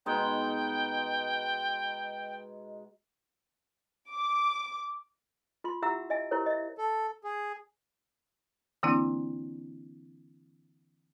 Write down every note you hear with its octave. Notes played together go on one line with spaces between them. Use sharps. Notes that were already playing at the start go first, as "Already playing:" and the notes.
B2 G#3 D#4 G5
D6
F4 C6
E4 G4 E5 F#5 A#5 E6
D#5 E5 G#5
E4 G4 A#4 C5 C#5
D#5 E5
A4
G#4
D3 E3 A#3 C4 D4 E4